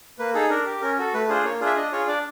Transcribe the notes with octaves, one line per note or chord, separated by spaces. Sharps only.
A#3 B4
D#4 G#4 A4
D4 A#4
G4
C#4 A#4
F#4 A4
A3 B4
D4 F4 G#4 C5
A#3 C#5
D4 F4 G#4
E5
D4 D#5
F4 G#4 C#5
D4 D5